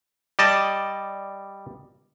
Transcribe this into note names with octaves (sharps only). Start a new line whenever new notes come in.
G3 D5 D#5 A5